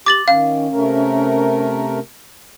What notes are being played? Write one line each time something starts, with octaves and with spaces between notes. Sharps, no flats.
G4 D6 A6 F#7
D#3 C#4 F5
C3 A3 A#4